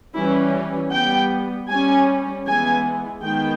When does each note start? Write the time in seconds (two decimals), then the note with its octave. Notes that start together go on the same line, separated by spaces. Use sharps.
0.15 E3 G3 C#4 E4
0.92 G3 B3 G5
1.69 G3 C#4 G#5
2.46 E3 G#3 B3 G#5
3.23 D#3 G#3 B3 G5